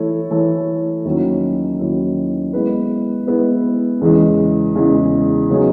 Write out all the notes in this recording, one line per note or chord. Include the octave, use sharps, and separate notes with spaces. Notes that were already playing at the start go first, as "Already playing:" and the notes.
Already playing: E3 A3 E4 A4 C#5
E3 A3 E4 A4 C#5
D#2 D#3 F#3 C#4 E4
D#2 D#3 F#3 C#4 E4
G#3 B3 E4 B4
G#3 B3 E4 B4
E2 C#3 E3 G#3
E2 C#3 E3 G#3
C#3 F#3 B3 D#4 G#4